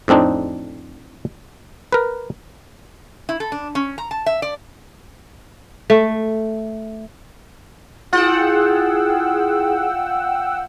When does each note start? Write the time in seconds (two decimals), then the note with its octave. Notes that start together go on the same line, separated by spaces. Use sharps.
0.08 F2 A2 C4 D4 D#4
1.92 A#4 B4
3.29 E4
3.40 A4
3.52 D4
3.75 C#4
3.98 A#5
4.11 A5
4.26 E5
4.42 D5
5.90 A3
8.13 E4 F4 G#4 F#5 G5 E6